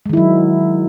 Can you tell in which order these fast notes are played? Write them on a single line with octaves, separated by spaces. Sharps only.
G#3 D#3 E4 F#3